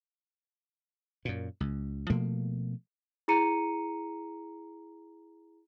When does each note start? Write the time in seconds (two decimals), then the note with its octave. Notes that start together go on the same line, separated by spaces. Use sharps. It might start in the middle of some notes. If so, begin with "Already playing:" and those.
1.25 F#2 A#2
1.60 C#2
2.10 B2 F3 A3 A#3
3.28 E4 G#4 A#5 C#7 D#7